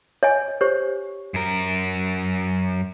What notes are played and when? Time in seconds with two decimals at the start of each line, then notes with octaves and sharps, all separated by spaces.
0.23 C#5 D#5 G#5
0.61 G4 C5 C#5
1.34 F#2 A#4